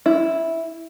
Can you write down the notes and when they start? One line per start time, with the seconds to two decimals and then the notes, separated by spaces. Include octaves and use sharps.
0.06 E4